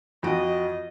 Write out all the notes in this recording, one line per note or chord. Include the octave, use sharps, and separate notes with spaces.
F2 F#4 D#5 D7